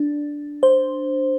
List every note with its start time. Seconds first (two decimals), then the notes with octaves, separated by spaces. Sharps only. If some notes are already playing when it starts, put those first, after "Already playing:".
Already playing: D4
0.63 C5